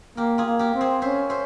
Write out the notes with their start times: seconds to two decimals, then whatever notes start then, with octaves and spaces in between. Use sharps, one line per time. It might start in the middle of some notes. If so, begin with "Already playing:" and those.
0.17 A#3 G4 A#4
0.38 F4 G#4
0.46 A#3
0.59 G4 A#4
0.75 C4
0.81 G#4 C5
1.02 C#4 C5 E5
1.30 C5 E5